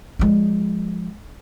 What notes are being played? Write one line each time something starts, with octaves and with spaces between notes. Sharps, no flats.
F3 G#3